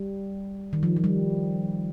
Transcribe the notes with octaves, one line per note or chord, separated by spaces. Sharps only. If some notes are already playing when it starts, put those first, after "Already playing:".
Already playing: G3
D#3
F3
F3
G3